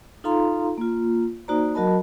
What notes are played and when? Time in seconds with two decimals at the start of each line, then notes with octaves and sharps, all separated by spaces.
0.24 D#4 F4 A4 F5 A#5 C6
0.78 A#3 F4
1.48 A#3 D#4 F#4 C5 D5 A#5
1.75 F#3 F#4 A#4 D#5 A5 B5